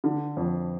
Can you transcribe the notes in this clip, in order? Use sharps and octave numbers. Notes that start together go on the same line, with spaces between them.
D3
F2